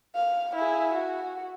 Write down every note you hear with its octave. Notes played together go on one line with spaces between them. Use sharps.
F5
E4 G#4
F#4